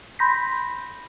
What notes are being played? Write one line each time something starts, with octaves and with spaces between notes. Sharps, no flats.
B5 C6 G6 A#6 B6